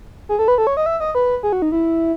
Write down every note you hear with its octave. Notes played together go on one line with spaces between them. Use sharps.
G#4
A4
B4
A4
C#5
D#5
E5
D#5
B4
G#4
F#4
D#4
E4